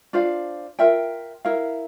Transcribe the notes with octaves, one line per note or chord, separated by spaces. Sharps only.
D4 F4 C5 F5
F4 A#4 E5 G5
E4 A#4 F5